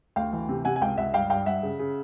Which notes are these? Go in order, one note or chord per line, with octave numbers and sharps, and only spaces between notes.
D2 F5 G5
E3
C3
C3 F#5 G#5
G#5
C#2 F5 G5
C#2 E5 F#5
G2 F5 G5
G2 F5 G5
G2 E5 F#5
C#3
C#3